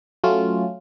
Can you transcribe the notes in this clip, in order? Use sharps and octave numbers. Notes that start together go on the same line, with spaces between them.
F#3 A3 C#4 F4